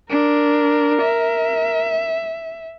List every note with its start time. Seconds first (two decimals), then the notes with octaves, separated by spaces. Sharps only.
0.10 D4 A#4
1.02 E5